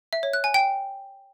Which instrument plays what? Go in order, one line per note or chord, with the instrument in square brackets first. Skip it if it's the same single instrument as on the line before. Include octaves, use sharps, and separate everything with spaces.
[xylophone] E5
C#5
F#6
G#5
G5